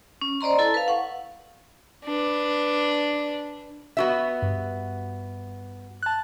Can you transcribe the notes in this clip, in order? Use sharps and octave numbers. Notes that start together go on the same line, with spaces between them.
C#4
C5 D5 D#5 A#5 C6
E4 A4 A5
B4 F5
F#5 C#6
D4 B4
B3 F#4 E5
G2
A5 F#6